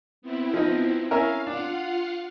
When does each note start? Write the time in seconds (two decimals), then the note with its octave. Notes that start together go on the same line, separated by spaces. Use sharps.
0.22 B3 C4 E4
0.54 F3 D#4
1.11 C#4 E4 A#4 F5
1.47 D4 F4 F5 F#5